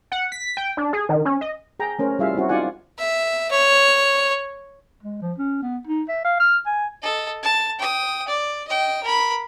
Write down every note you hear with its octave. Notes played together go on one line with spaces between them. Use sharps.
F#5
B6
G5
D4
G#4
D#3
C#4
D#5
G#4 G5 A#5
A3 C#4 A#4 C5
G3 E4 F4 G#4 E5 F5
C4 C#4 E4 F#4
D#4 F4 D5 F#5 G#5
E5
C#5
G#3
F3
C#4
B3
D#4
E5
F5
F6
G#5
A4 D#5
A5
G5 D#6
D5
D#5 G5
A#4 B5